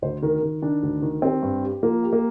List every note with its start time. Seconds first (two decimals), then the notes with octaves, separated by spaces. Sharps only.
0.02 D2 C5
0.22 D#3 A#4
0.43 D#3
0.62 D#3 D4
0.83 D2
1.02 D#3
1.22 C4 G4
1.42 G2
1.63 G4
1.83 F3 A#3
2.03 G4
2.13 A#3